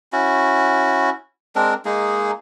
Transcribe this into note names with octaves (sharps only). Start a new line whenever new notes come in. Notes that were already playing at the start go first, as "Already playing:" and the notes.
C#4 E4 F#4
G#3 C4 D4 A#4
G#3 A#3 D#4 G#4